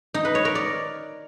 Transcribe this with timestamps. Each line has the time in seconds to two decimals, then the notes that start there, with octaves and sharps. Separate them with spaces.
0.14 D#4
0.25 B4
0.35 C#5
0.45 A#4
0.55 D5